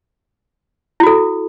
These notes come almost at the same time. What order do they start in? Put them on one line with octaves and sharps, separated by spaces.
E4 F#4 A4